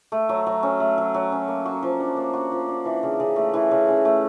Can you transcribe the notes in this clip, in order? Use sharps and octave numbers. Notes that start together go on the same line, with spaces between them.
A3
F#3
F#3
C#4
A3
F#3
F#3
C#4
A#3
F#4
F3
D4
A#3
F#4
F3
D4
E3
C#3
C#3
A3
E3
C#3
C#3
A3